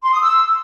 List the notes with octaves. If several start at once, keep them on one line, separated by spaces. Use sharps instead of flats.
C6
D#6
E6